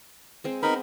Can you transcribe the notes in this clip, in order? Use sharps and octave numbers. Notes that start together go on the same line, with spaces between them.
G#3 C4 C5
B3 C4 D#4 A#4 B5